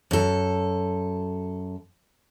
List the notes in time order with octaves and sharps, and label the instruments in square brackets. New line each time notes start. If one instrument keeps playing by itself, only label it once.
[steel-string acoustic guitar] F#2 A4